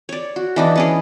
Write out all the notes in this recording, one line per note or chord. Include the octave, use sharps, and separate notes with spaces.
C#5 D5
F#4
E3 D4 D#4
B3 C#4 G#4